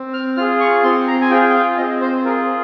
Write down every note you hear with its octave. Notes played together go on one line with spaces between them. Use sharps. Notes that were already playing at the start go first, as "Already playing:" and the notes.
Already playing: C4
F6
F4 G#4 F6
C#6
C4 C6
A#5
G#5
F4 G#4 G5
G5
F5
C4 D#5
C5
F4 G#4 A#4